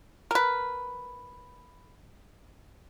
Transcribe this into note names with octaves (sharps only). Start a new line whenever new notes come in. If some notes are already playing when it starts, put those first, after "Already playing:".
A#4 B4